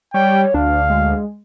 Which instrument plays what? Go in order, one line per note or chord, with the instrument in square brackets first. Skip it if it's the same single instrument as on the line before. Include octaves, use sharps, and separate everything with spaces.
[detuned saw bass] G3 [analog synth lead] C#5 [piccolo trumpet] G5
[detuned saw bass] D2 [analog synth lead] D4 [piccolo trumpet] F5
[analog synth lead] G#3